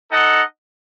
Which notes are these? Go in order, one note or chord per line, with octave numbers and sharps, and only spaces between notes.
D#4 A4 D#5 F#5